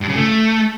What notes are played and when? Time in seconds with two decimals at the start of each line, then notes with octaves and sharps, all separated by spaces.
0.01 G2
0.09 C#3
0.16 A3